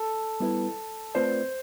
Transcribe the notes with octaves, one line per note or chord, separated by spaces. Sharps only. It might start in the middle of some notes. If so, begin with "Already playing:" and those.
Already playing: A4
G3 B3 E4 B4
A3 C4 F4 B4 C5 D5